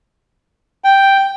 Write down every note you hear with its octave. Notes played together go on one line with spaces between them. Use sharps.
G5